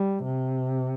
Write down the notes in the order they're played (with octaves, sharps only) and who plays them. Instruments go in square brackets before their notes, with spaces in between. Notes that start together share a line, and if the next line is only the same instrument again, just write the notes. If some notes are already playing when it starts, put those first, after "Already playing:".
Already playing: [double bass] G3
C3